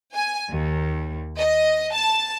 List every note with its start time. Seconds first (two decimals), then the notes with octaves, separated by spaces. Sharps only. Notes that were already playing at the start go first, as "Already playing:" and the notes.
0.14 G#5
0.50 D#2
1.37 D#5
1.93 A5